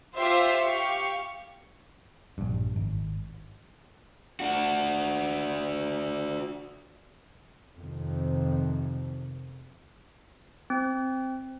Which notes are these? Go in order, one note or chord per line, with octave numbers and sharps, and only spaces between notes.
F4 G4 C5 E5 C7
G4 F5 C#6
A#1 G2
G#1
D4 F#4
F2 C3 D#3
C4